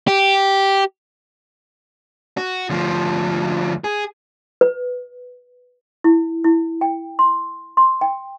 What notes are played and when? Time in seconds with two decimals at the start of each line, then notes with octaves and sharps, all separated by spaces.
0.08 G4
2.37 F#4
2.69 D2 F3
3.84 G#4
4.61 B4
6.04 E4
6.44 E4
6.81 G5
7.19 C6
7.77 C6
8.01 G5